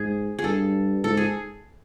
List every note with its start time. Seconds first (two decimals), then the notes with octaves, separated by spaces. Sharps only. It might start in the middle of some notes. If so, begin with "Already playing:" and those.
Already playing: G#2 G#4
0.39 G#4
0.44 G2 A4
1.04 G#2 A4
1.17 G#4